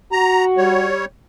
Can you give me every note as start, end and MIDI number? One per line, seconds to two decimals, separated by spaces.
0.12 0.88 66
0.12 0.45 82
0.57 1.05 55
0.57 1.05 73